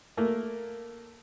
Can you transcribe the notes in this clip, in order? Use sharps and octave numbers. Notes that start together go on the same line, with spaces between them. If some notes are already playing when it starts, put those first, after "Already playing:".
A3 A#3